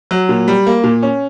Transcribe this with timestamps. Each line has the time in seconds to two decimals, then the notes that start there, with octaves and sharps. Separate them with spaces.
0.11 F#3
0.29 A#2
0.48 G3
0.67 A#3
0.84 A#2
1.03 C#4